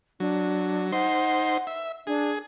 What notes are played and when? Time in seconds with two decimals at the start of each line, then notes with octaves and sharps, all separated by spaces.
0.20 F#3 D4
0.92 D#4 C5 F#5 C6
1.67 E5
2.07 D4 G#4